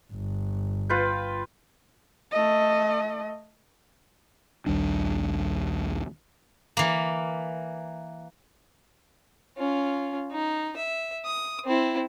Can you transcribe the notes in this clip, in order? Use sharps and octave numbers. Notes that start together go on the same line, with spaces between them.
G1
F4 B4 G5
A3 D#5
A#1 D#2 G3 D4
E3 A#3
C#4 F4
D#4
E5
D#6
C4 E4